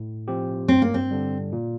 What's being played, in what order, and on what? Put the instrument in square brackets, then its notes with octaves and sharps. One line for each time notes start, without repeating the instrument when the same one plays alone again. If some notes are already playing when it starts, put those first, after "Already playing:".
Already playing: [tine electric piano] A2
F3 C4 G4
[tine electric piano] G2 [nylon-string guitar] C4
[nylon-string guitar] A#3
C4
[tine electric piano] D3 G3
A#2